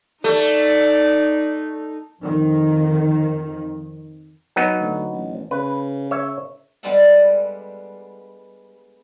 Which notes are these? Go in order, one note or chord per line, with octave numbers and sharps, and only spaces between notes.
A3 D#4 D5
F2 D#3
F#3 B3 D#4
D2
A1
C#3 B4
C#5 E5
G3 G#3 B3 D4 A4 F#5